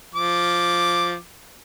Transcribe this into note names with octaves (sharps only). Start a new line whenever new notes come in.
F3 D6